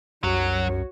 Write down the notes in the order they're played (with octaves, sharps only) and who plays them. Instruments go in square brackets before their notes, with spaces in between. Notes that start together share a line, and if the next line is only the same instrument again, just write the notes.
[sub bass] C2 [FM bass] F#2 [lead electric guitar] F#3 [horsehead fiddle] F#4 C#5